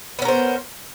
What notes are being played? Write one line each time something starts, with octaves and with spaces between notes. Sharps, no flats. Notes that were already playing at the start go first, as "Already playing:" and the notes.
B3 C#4 A#4 C5